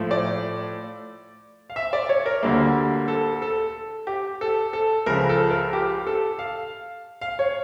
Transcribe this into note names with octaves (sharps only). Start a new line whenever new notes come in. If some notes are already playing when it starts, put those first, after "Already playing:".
Already playing: A2 F3 A3
D5
F5
E5
D5
C#5
A#4
D2 D3 G3 A#3
A4
A4
G4
A4
A4
C#2 C#3 F3 A#4
A4
A#4
G4
A4
F5
F5
C#5